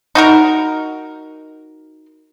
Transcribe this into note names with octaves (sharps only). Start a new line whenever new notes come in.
D#4 F#4 A#4